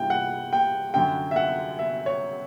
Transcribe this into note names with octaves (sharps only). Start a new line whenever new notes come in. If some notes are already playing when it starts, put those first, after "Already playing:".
Already playing: G2 E3 G5
F#5
G5
F#2 D3 F#3 G5
E5
F#5
E5
C#5